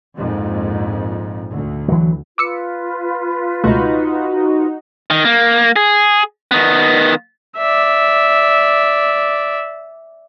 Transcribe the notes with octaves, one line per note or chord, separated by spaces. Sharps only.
A#1 F2 G#2
D2
E3 F#3
F4 B4 D6 E6 C#7
C#2 B2 A3 D#4 F#4
D#3
A#3
G#4
D#3 B3
D5 E5